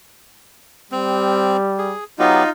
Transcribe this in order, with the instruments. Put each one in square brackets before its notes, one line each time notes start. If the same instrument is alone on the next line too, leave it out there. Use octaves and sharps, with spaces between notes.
[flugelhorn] G3 [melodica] C4
[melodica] G#4
[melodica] F#3 B3 G4 [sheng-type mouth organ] D#4 F4